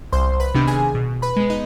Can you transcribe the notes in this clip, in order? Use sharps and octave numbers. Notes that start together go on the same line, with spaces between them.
C2 C5 C6
B4 B5
C3 D#3 B3 D4
G#4 G#5
B2
B4 B5
G#3 B3
D#4 D#5